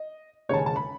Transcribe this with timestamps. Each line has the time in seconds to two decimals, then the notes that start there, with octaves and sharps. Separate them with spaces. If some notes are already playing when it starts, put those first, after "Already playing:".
Already playing: D#5
0.49 E1 D#2 C#3 G#3 C#5 A5
0.58 G#5
0.66 A5
0.76 B5